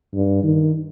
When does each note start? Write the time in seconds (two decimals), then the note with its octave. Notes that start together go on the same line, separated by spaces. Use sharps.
0.14 G2
0.43 D#3